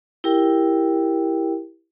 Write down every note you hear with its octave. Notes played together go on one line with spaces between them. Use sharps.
E4 G4 A#4 G5